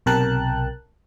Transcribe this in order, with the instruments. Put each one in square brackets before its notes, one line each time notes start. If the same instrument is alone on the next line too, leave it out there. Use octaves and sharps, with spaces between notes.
[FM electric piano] B1 C3 A#4 G5 A5 F#6